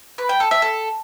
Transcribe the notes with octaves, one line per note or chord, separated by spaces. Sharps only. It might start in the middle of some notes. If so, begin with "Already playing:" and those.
B4
G5
A4
E5
A4